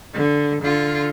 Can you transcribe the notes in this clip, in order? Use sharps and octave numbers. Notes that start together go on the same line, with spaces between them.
D3
D3 F4